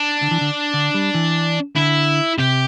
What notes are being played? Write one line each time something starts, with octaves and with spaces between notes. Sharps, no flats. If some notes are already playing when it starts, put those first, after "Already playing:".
Already playing: D4
D3
E3
D3
D3
G3
E3
D3 E4
C3 G4